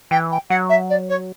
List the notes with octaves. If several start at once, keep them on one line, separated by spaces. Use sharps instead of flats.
E3 G5
G5
F#3 F#5
E5
D5
C#5